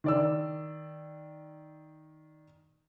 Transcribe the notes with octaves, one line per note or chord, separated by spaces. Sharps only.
D#3 D5 E6